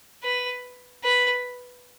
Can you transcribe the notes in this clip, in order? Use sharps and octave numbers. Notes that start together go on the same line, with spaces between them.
B4
B4